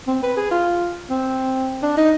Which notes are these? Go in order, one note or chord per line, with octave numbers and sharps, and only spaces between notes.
C4
B4
G#4
F4
C4
D4
D#4